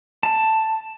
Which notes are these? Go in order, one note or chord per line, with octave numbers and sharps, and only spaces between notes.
A5